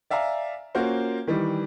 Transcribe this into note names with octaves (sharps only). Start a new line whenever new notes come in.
D5 E5 F5 G#5 A#5
A#3 C#4 F4 F#4 A#4 C5
D#3 E3 G3